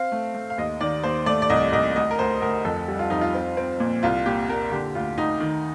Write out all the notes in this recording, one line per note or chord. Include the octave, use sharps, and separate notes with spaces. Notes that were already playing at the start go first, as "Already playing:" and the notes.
Already playing: C4 F5
A3
A3
F5
D#2 D#5
D#3 D5
D#2 C5
A3 D5
D5
C2 D#5
C2 D#5
D2 D#5
A#4
D2 C5
D2 A#4
F2 A4
G3
F4
F2 D#4
F4
C4
C4
A#2
C2 F4
A#2 G4
A#2 A#4
D3 G4
D2 F4
D2 D#4
D#3